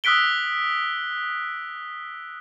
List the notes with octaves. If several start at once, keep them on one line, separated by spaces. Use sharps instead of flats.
D#6 E6 F#6 B6 D7 G7